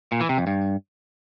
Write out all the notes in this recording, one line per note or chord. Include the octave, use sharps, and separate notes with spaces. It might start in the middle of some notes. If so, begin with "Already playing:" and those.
A#2
E3
C3
F2
G2